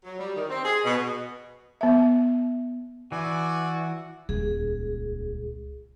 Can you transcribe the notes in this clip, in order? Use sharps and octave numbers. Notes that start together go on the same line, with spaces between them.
F#3
G3
D#3
C4
G#4
B2
B3 E5
E3 F#4 D5 G#5
D#1 C#2 G#4